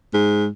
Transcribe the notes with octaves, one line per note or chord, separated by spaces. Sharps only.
G#2